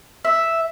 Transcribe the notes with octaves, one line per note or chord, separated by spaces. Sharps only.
E5